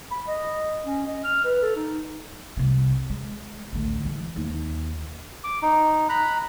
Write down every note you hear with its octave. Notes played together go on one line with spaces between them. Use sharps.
B5
D#5
C#4
D#5
F6
B4
A4
D#4
C2 C3
G#3
A1 D2
E3 G#3
D#2
D6
D#4
A#5 B5 F#6